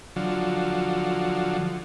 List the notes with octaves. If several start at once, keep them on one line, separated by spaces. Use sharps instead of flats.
D3 F3 F#3